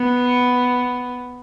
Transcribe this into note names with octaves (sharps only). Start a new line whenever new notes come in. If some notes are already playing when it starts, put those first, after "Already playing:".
Already playing: B3